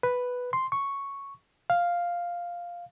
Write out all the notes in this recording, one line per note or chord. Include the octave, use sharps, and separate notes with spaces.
B4
C6
C#6
F5